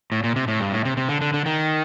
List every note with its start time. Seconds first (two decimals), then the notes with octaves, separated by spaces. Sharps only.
0.12 A2
0.24 A#2
0.36 C3
0.48 A2
0.60 G2
0.73 A2
0.85 C3
0.97 C3
1.09 D3
1.21 D3
1.34 D3
1.46 D#3